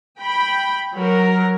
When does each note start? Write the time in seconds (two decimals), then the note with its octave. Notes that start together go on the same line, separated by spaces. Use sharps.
0.19 G5 B5
0.94 F#3 A#4